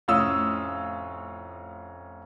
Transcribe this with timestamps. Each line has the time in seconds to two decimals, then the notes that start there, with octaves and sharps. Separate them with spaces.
0.08 F1 A2 C#4 F4 D#6 E6